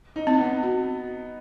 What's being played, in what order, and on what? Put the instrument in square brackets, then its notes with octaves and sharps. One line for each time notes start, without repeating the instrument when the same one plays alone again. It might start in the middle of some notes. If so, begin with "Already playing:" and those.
[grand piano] D#4
[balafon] C4
[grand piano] B3
[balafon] F#4